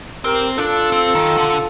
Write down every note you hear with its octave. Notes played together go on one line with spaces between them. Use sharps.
C4 G4 A#4
D4 F4 A4
C4
D#3
D3